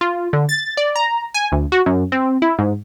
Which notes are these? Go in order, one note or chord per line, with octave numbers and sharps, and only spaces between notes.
F4
D3
A6
D5
A#5
G#5
D2
F#4
F#2
C4
E4
G#2